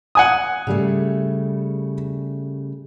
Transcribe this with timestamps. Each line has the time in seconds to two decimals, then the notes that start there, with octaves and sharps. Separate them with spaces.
0.15 F#5 G#5 D#6
0.67 C#3 G3 A3